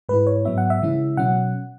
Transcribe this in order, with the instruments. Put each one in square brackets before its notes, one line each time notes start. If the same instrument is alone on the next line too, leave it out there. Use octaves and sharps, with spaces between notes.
[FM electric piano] G#2 G#3 E4 B4
C#5
G#2 F#3 B3 E5
F#5
E5
C#3 E3 G#3 C#4 E4
B2 F#3 C#4 F#5